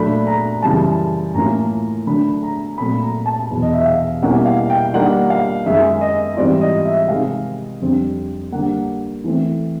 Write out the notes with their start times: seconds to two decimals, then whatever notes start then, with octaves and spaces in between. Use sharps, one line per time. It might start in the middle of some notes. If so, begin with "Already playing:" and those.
Already playing: A#2 F#3 A3 D4 B5
0.27 A#5
0.62 F#2 C#3 E3 G3 A5
1.34 A2 F#3 A#3 C#4 F4 A#5
2.06 D3 F#3 A3 B5
2.43 A#5
2.78 A#2 F#3 A3 C4 B5
3.02 A#5
3.26 A5
3.50 E2 B2 F#3
3.62 D#5
3.73 E5
3.85 F5
4.22 B2 G3 A#3 C#4 E4 F#5
4.46 F5
4.70 G5
4.94 D#3 G3 A#3 D4 F4 F#5
5.30 F5
5.66 F#2 D#3 G#3 E5
6.01 D#5
6.37 G#2 E3 G3 C4 F4 D5
6.61 D#5
6.85 E5
7.09 C3 D#3 G#3 F5
7.81 F2 D3 G3 C4
8.52 D3 G3 A#3 F#5
9.24 E3 A3 C4